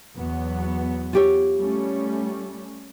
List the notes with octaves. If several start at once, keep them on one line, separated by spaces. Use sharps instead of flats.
E2 F#3 B3
F4 G4 C#5
G3 A3 C#4